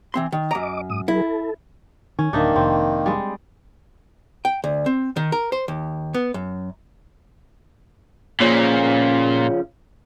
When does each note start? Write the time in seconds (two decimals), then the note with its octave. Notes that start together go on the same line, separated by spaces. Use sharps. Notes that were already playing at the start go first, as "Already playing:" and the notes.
0.14 E3 C4 C6
0.32 D#3
0.51 F#2 D#5 A#5 D6
0.90 G#2 D#6
1.08 F#3 E4 G#4 A#4
1.22 A4
2.19 D#3 C#4
2.33 D1 D#3 A#3 D4 D#4 E5
2.56 F1 C4
3.06 G3 G#3
4.45 G5
4.64 D2
4.86 C4
5.17 D#3
5.32 A#4
5.52 C5
5.68 D#2
6.14 B3
6.34 F#2
8.41 A#2 C#3 F3 C#4